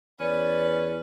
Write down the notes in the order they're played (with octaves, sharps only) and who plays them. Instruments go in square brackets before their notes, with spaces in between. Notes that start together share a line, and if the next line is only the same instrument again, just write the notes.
[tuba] E2 [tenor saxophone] C#4 [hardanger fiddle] B4 [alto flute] D5